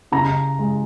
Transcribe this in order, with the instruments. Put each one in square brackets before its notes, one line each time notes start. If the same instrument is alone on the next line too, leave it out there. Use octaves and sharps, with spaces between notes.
[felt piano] C#3 A#5
G#3